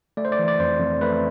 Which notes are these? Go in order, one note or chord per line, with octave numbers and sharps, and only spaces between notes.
A3 D5
C5
D5
E3
D5
F2 C5
F2
A3 B4